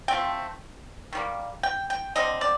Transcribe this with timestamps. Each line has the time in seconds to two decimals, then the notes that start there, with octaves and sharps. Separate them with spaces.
0.08 F3 A3 C4 G5
1.13 D#3 G3 A#3
1.63 G5
1.90 G5
2.15 D3 G3 C4 D#5
2.41 D5